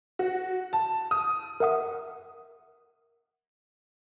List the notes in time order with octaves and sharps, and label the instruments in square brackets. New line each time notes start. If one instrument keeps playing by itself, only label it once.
[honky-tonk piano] F#4
A5
D#6
[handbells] A#4 E5 F#5 D#6